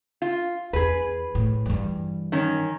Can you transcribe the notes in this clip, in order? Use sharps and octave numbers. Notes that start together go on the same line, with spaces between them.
F4
E2 G#4 B4
A2
G2 E3
D#3 C#4